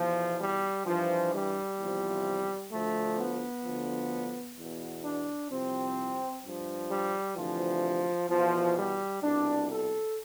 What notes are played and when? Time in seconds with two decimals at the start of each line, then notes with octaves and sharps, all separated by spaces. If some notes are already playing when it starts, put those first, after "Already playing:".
Already playing: E2 B2 F3
0.39 G3
0.85 G2 E3 F3
1.32 G3
1.78 E2 C3 F3
2.71 D2 D3 F3 A3
3.17 B3
3.64 D2 D3 F3
4.57 E2
4.63 B2
5.03 D4
5.50 C2 C3 F3 C4
6.43 G2 F3
6.90 G3
7.36 D2 C3 E3 F3
8.29 E2 B2 F3
8.76 G3
9.22 C2 B2 D4
9.69 A4